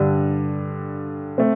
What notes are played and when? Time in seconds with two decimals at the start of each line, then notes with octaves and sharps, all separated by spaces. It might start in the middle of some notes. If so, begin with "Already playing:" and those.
Already playing: G2 D3 G3
1.38 A3 C4